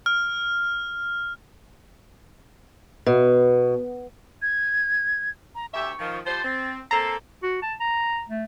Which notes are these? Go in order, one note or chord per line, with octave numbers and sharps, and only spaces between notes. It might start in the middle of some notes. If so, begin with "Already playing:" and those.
F6
B2
G#6
A#5
D2 G4 E5 C#6
D#3 F3
F3 G3 C5 A6
C4
A#3 C4 A4 A#5 C7
F#4
A5
A#5
A3